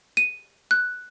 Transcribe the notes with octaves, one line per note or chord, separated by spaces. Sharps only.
D#7
F#6